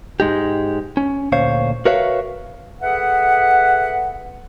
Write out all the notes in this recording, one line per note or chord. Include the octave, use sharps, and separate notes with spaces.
G#2 G#3 D#4 G4
C#4
D2 A#2 C5 C#5 F5
F#4 A#4 B4 C#5 E5 F5
G#4 A4 B4 E5 F#5